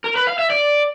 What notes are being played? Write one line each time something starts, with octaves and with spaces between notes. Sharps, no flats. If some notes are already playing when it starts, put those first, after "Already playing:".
A#4
B4
F5
E5
D5